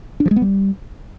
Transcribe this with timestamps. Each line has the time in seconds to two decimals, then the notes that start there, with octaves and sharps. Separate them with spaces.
0.20 D4
0.25 F3
0.31 G#3
0.36 B3
0.42 G3